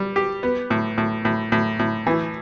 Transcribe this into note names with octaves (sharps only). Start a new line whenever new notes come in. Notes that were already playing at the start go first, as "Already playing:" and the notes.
Already playing: G3
G4
B3
A2
A2
A2
A2
A2
E3